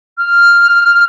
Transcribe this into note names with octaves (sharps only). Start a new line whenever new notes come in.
F6